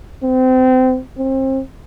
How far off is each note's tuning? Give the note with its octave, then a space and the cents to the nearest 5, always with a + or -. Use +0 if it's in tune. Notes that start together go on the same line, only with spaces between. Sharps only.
C4 -30
C4 +30